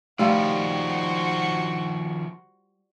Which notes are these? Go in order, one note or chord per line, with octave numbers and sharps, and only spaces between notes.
D#3 F3 G3 A3 F4 F#4 C5